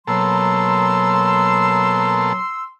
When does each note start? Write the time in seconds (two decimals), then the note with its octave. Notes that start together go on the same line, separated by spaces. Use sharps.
0.07 B2 F#3 A#3 A4 C6 E6